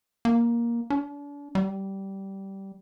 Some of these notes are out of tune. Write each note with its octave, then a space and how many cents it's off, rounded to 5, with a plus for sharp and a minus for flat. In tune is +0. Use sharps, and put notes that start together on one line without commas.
A#3 +10
D4 -40
G3 -15